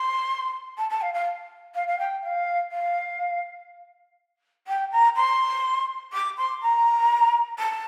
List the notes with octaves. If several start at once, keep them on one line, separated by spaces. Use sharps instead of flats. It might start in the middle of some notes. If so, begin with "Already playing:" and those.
Already playing: C6
A5
A5
F5
F5
F5
F5
G5
F5
F5
G5
A#5
C6
D6
C6
A#5
A5